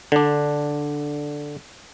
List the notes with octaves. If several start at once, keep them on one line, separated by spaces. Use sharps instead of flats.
D3 D4